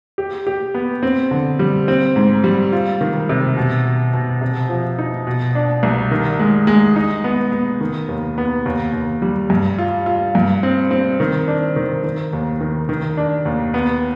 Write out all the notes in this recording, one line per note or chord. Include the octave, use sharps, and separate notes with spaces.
G4
G4
B3
C4
D3
G3
C4
G#2
G3
F4
D#3
C3
B2
B2
B2
C3
F3
D#4
B2
D4
C2
D#3
G#3
G#3
D#4
B3
B3
D#3
D#2
B3
D#2
D#2
G3
G2
F4
F4
G2
C4
C4
D#3
D4
D#3
D#3
D#2
D#3
D#3
D4
D#2
B3